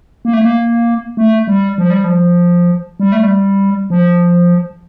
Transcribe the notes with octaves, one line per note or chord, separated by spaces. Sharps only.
A#3
A3
A#3
A3
G3
F3
G3
F3
G3
A3
G3
F3